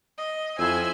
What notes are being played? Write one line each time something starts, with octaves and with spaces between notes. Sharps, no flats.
D#5
F2 E4 C5 G#5 E6